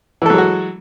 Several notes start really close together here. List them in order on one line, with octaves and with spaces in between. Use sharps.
E3 A4 F#3 G#3 F#4